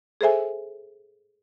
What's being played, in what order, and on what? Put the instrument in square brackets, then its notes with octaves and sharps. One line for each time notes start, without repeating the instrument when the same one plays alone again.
[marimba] G#4 A4 C5 E5 G#5